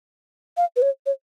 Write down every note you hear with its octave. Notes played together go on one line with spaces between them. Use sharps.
F5
B4
C#5
C#5